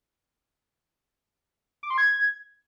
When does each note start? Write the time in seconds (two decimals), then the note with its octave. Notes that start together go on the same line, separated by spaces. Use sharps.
1.83 D6
1.90 C6
1.98 G#6